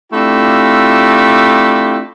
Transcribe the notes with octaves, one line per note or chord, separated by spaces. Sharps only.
A3 C4 D4 E4 F4 G4